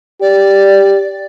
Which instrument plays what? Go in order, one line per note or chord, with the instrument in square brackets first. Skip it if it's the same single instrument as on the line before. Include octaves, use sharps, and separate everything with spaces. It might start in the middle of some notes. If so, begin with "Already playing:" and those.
[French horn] G4 [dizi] D5